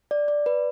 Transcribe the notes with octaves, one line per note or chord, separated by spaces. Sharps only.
D5
D5
B4